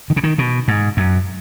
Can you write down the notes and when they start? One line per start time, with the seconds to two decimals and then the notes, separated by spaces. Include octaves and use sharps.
0.10 D#3
0.16 C#3
0.24 D#3
0.38 B2
0.68 G#2
0.97 F#2